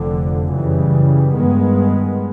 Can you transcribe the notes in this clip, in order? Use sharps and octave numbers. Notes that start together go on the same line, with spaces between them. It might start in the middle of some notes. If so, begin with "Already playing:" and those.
Already playing: F1 F2 D3
F#2 C#3 E3 G3
G2 D#3 G#3 B3